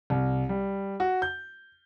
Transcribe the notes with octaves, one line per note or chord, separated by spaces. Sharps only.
C2
G3
F#4
G6